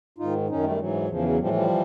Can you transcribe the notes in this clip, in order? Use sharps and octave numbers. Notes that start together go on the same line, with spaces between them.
G#2 D#3 D#4 F4
F#2 D#3 C#4 D#4
G3 A3
G#2 E3 F#3
E2 C#3 E3 F3
F#3
A2 E3 F3 G3
F3 G3
E3